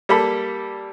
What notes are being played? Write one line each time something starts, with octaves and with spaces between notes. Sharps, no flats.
G3 A#3 A4 B5